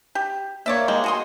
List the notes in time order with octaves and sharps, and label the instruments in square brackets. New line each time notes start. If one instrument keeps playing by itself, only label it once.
[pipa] G4
[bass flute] A#3 [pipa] C#5 D5 E5
[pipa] G3 [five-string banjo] G#3
[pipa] F#4 G#4 C6